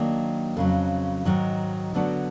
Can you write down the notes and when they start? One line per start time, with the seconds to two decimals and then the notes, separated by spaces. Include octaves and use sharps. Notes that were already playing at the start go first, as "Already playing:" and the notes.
Already playing: D#3 F#3 A#3 D4
0.57 F2 C#3 F#3
1.25 G#2 D#3 F#3
1.94 D3 F#3 B3 D4 F#4